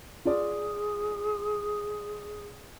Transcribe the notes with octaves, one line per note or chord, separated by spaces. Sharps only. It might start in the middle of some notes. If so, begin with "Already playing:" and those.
F4 G#4 D5